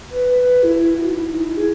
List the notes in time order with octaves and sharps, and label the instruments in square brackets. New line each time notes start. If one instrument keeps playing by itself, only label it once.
[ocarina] B4
E4
F#4
D#4
E4
D#4
E4
G#4